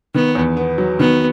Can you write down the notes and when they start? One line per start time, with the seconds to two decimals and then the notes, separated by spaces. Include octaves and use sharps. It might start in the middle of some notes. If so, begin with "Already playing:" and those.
0.14 D#3 B3
0.35 E2
0.57 B3
0.78 F#3
0.99 D#3 B3